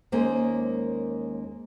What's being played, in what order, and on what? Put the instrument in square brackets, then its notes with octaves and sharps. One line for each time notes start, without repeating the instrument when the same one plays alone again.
[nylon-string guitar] D#2 G#3 A#3 C#4 C5 G#5